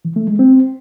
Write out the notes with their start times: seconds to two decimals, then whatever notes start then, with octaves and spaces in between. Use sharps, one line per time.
0.05 E3
0.16 A3
0.28 G#3
0.39 C4